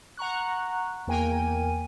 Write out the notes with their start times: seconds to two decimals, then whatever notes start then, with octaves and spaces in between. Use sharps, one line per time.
0.17 F#5 A#5 C#6 F#6
1.07 E2 A#3 A#4 G5 G#5 D#7